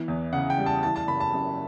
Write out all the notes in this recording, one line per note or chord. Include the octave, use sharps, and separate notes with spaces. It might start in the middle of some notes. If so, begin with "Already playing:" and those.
Already playing: E3 B3
E2
C#3 F#5
G5
G3
A5
E3 A5
A5
F#1 B5
A5
F#2